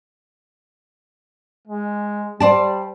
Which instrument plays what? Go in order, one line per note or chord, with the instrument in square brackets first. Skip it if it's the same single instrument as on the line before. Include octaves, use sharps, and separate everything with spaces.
[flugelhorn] G#3
[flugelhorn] G3 [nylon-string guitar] C5 D5 A5